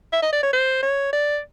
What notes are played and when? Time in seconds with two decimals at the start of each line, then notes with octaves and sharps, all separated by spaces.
0.13 E5
0.22 D#5
0.33 D5
0.43 C#5
0.53 C5
0.82 C#5
1.13 D5